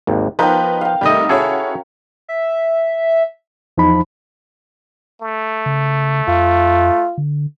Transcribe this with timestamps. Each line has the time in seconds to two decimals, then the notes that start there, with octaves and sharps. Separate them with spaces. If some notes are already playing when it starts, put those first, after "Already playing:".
0.07 G#1 D#2
0.39 F3 B3 D#4 A#4 B4 F5 G5
0.81 F5 G5
1.01 C3 D#3 G3 A3 D#5
1.29 C#4 E4 F#4 G#4 A4 C#5
2.29 E5
3.78 E2 F3 D#4 B5
5.22 A3
5.66 C#3
6.28 F2 F4
7.18 D3